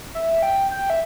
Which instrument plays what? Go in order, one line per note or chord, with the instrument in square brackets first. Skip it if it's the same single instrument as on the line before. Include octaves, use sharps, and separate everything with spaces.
[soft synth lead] E5
G5
G5
E5